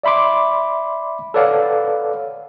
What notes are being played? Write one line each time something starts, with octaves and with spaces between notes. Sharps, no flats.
D5 E5 B5 C6 D6
A4 B4 C#5 D5 F5 F#5